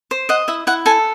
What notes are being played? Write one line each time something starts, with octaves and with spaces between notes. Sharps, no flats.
C5
D#5 F#5
E4 E5
E4 F#5
A4 G#5